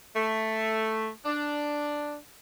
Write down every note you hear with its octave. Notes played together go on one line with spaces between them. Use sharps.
A3
D4